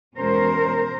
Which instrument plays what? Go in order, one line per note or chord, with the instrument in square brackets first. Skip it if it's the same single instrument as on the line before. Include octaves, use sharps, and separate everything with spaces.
[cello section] E2 B2 G#3 C#4 A#4 C5